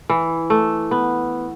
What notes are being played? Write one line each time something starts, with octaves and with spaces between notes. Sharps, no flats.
E3
A3
B3